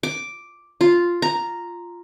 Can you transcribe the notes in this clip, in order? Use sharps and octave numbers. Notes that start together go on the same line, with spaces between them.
D6
F4
A#5